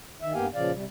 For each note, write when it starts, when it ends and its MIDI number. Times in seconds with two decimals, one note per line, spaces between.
0.22 0.33 51
0.22 0.33 76
0.34 0.47 43
0.34 0.47 58
0.34 0.47 59
0.34 0.47 67
0.34 0.47 77
0.34 0.47 80
0.55 0.72 46
0.55 0.72 49
0.55 0.72 53
0.55 0.72 74
0.55 0.72 77
0.74 0.85 48
0.74 0.85 55